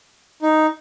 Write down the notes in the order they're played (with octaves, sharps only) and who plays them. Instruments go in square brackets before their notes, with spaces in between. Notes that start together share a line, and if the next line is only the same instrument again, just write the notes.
[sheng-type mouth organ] D#4